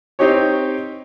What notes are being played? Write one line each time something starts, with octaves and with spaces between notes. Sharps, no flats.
C4 D#4 G4 C#5